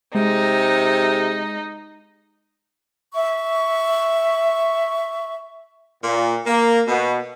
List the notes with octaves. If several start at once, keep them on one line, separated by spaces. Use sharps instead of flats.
C3 G#3 D#4
E5 C#6
A#2
A#3
B2